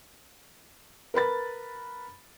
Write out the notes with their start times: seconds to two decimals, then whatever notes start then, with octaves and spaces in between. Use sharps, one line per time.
1.14 A#4 B4 B5 A6